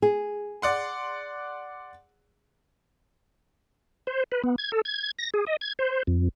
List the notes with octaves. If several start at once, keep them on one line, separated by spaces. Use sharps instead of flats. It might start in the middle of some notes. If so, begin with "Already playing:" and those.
G#4
D5 F#5 C6
C5
B4
B3
G#6
A4
G#6
A#6
G#4
D#5
G#6
C5
F2